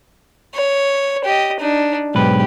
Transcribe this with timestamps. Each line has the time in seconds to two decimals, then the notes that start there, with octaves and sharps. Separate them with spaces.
0.54 C#5
1.24 G4 D#5
1.60 D4 D#4
2.15 B1 G#2 G4 B4